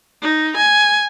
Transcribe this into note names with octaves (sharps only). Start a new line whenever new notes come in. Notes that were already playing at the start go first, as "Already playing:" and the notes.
D#4
G#5